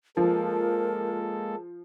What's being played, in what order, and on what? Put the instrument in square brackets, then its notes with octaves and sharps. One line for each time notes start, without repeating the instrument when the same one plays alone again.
[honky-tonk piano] F3 [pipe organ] G#3 A#3 A4 [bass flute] A#4